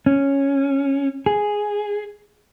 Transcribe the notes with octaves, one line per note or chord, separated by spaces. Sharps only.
C#4
G#4